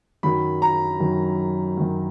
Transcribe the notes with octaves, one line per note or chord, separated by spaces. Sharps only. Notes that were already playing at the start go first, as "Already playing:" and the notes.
F#2 D#3 F#3 B5
A#5
F#2 D#3 F#3
F#2 D#3 F#3